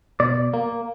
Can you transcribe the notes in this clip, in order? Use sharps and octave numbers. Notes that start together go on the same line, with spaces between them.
B2 D5
A#3